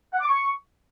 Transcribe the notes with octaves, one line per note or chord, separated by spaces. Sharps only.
F#5
D6
C#6